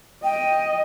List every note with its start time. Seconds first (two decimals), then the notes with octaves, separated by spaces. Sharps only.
0.24 D#5 G5